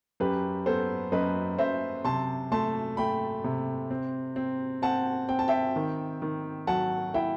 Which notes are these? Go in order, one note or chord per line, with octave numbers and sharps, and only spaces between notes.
F#2 G4 B4
B3 A4 C5
F#2 B4 D#5
F#2 C5 E5
C3 A5 C6
A3 A5 C6
A3 G5 B5
C3
C4
C4
C4 F#5 A5
C4 G5
A5
E5 G5
D#3
D#3
F#3 F#5 A5
E4 E5 G5